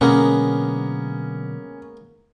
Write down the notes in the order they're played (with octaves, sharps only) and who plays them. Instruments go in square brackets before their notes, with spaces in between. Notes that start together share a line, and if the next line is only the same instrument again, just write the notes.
[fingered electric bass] B2 D3 F#3 [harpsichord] G#3 A#3 B3 [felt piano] C#4